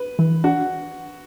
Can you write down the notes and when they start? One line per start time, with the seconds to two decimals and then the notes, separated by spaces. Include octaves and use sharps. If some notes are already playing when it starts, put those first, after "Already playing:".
Already playing: B4
0.19 E3
0.44 D4 F#4